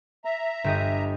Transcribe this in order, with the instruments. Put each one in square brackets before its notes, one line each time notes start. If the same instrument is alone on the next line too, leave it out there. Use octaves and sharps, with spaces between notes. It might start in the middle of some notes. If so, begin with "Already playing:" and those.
[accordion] E5 A#5
[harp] G1 G4 D#5